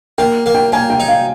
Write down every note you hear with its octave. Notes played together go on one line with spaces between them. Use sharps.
A#3 G5
A#3
G5
A#3 G#5
G5
D#4
F5